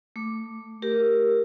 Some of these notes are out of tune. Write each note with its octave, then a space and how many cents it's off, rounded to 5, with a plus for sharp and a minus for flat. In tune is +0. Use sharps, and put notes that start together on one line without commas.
A3 +15 D6 +0
G4 +0 A#4 +0